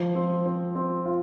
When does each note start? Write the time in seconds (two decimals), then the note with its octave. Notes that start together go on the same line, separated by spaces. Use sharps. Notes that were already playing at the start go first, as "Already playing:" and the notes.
Already playing: F3
0.15 C4
0.46 C4
0.75 C4
1.05 F4